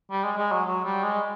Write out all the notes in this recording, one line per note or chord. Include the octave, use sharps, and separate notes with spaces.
G3
G#3
G#3
F#3
F#3
G3
G#3